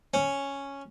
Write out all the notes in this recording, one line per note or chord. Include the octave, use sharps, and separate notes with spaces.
C#4